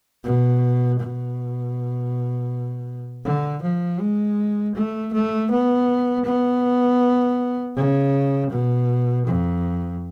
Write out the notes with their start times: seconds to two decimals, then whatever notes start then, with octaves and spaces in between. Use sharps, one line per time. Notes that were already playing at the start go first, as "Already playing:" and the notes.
0.24 B2
1.00 B2
3.25 D3
3.62 F3
4.00 G#3
4.75 A3
5.13 A3
5.51 B3
6.25 B3
7.76 C#3
8.51 B2
9.27 F2